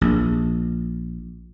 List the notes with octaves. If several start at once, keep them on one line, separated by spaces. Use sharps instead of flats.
A#1